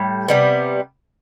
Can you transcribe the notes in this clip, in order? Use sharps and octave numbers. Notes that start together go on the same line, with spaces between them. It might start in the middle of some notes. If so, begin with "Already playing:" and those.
Already playing: A2 G3
C3 G3 B3